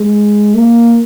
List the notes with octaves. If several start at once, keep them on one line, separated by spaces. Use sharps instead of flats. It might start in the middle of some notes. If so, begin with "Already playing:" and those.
Already playing: G#3
A#3